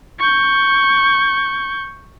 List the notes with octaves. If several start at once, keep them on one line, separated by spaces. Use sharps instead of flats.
C#6 G6